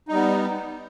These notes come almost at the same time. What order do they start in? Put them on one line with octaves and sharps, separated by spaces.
D#4 G3 B3